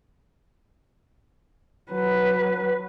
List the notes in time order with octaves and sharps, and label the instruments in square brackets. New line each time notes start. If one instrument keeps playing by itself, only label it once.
[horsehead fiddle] F#3 B4